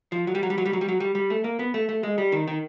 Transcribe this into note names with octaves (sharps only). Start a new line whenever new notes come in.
F3
F#3
G3
F#3
G3
F#3
G3
F#3
G3
F#3
G3
G3
A3
A#3
B3
A3
A3
G#3
G3
D#3
D#3